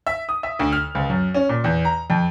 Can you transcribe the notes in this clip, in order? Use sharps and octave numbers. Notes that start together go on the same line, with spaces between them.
E5
D#6
E5
D2
F6
C#2
F#2
C#4
A#2
E2
A#5
F2